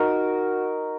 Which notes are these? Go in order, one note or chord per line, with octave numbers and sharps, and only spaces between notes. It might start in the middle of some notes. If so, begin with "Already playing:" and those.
Already playing: D#4 F#4 A#4